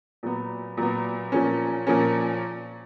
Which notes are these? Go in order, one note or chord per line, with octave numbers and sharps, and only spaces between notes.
A#2 F#3 B3
A#2 F#3 B3
A#2 F3 A#3 C#4
A#2 F3 A#3 C#4